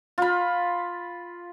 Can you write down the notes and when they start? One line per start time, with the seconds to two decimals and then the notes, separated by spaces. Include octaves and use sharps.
0.18 F4 B5